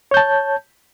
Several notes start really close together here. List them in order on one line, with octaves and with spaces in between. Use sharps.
C#5 G6 A5